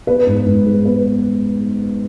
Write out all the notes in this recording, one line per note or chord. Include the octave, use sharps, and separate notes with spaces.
B3 B4
G#2
G#2
G#3
B3 B4